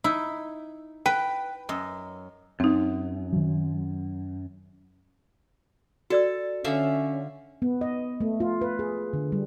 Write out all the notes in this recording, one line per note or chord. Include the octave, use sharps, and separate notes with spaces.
D#4 E4
B4 G5
F#2 D#5
F#2 C4 D#4
D#3 F#3
F#4 A4 D5 E6
D3 C#4 E5 F5
B3
D#5
A3
F4
B4
G#4
D3
G3